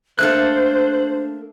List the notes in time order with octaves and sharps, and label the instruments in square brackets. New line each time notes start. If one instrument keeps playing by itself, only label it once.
[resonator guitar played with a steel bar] A3 A#3 A4 [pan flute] D4 [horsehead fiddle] C5 [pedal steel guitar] F#6